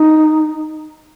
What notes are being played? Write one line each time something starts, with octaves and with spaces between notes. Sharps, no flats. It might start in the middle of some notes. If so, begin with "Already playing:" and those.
Already playing: D#4